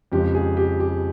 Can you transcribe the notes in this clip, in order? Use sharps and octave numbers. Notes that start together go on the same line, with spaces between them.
F2 C#3 F3 G#3 G4
G#4
G4
G4